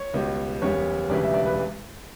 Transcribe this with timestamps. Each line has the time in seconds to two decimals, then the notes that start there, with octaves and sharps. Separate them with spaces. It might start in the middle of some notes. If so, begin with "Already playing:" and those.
Already playing: C#5
0.14 C#2 B2 G3
0.62 F#1 E2 C#3 G3 C#5
1.10 E1 D2 C#3 E3 G3 D5
1.23 E5
1.34 D5
1.46 B4